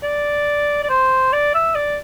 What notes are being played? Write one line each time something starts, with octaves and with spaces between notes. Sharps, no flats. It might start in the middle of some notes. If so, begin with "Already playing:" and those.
D5
D5
C5
D5
E5
D5